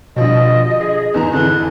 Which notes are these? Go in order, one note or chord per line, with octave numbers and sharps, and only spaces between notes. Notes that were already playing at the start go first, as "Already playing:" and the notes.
B2 D3 F3 G3 D#5
G#4
E2 D#3 A#5
F2 D3 E3 F#6